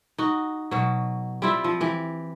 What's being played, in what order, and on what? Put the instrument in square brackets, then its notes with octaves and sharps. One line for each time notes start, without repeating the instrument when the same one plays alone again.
[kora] D#4 F#4
B2 F#3
G3 C4 E4 F4
F3
E3 G4